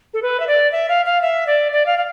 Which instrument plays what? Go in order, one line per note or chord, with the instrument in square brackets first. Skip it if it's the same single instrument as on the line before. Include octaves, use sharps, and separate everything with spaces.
[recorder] A4
B4
E5
D5
E5
F5
F5
E5
D5
D5
F5
F5